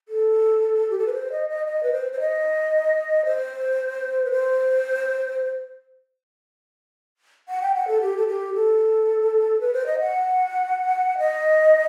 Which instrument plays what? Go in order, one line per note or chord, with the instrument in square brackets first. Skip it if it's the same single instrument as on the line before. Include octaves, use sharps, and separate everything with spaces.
[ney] A4
G4
A4
B4
C5
D#5
D#5
D#5
B4
C5
C5
D#5
C5
B4
C5
F#5
G5
F#5
A4
G4
A4
G4
A4
B4
C5
D#5
F#5
D#5